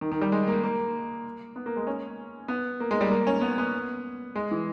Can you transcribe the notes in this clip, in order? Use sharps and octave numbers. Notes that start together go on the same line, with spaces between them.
D#3
D#3
G3
G#3
A#3
A#3
B3
A#3
G#3
C#4
B3
A#3
G#3
G3
A#3
C#4
B3
B3
G#3
E3